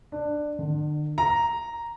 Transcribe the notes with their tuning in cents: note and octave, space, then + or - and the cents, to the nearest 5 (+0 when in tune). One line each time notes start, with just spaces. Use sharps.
D4 +15
D3 +40
A#5 +0